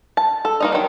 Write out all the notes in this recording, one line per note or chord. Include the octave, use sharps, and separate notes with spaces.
A5
A4
A#3 D#4 D#5
D#3 F#3